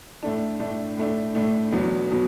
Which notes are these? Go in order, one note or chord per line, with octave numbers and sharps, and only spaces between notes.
A2 A3 D4
A2 A3 D4
A2 A3 D4
A2 A3 D4
E2 B2 F#3 B3
B2 F#3